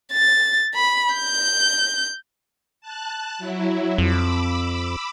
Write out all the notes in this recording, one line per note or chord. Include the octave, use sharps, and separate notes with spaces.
A6
B5
G6
A5 F#6
F#3 E4
F2 B5 D6 E6